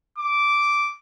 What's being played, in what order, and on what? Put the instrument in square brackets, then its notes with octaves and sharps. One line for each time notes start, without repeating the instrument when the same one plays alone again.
[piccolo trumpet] D6